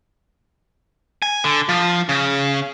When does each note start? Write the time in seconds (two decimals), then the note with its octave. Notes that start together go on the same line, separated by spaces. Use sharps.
1.22 G#5
1.45 D3
1.69 F3
2.09 C#3